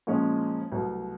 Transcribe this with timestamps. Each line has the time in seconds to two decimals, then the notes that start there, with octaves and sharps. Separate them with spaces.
0.07 A#2 F3 G#3 C#4
0.72 C2 B2 F#3 A3